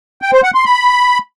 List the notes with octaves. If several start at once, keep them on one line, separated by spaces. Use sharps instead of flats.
G5
C5
F#5
C6
B5